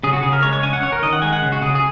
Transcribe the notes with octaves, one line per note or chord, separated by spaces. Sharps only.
C#3 G#4
F#4
C#3 G#4
A#4
G#3 C#5
C#5
C#4 G#5
F#5
C#4 C#5
A#4
D#3 D#5
F#5
G#3 G#5
F#5
C#3
F#4
C#3 G#4
G#4